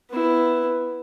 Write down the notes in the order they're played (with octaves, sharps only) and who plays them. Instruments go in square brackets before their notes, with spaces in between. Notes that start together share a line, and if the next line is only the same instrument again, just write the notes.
[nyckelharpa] B3 E4